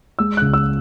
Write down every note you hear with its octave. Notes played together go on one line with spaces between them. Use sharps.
G#3 E6
C#2 F#6
E6